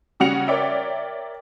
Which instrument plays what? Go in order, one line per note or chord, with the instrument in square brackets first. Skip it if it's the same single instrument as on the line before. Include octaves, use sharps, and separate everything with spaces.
[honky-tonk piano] C#3 G3 F#4 C#7 F7
A#4 C#5 D5 E5 G5